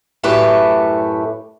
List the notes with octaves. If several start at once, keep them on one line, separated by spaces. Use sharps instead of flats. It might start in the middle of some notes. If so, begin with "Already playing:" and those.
F#2 A2 A3 E4 G4 B4